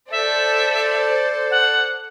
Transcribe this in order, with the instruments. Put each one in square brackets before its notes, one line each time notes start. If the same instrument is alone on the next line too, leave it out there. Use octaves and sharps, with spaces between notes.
[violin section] A4 C5 D5 [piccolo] E5
[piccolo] F#5